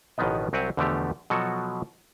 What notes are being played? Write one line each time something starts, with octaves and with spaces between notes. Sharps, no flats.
A1 B2 D#3 F3 B3 D#5
C2 F#3 C4 G4 F#5 G#5
E2 B2 D3 F3 A3 G4
B2 F3 F#3 F#4 A4